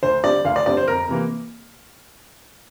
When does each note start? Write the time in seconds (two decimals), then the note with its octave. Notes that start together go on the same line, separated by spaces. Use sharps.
0.03 D2 C5
0.24 D3 G3 C4 D5
0.45 D2 F5
0.56 D5
0.66 D3 G3 C4 D5
0.77 C5
0.88 F2 A#4
1.09 C3 E3 A#3